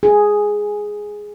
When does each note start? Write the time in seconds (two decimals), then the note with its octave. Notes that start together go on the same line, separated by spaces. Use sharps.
0.03 G#4